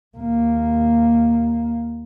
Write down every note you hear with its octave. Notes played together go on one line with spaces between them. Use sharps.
D#2 A#3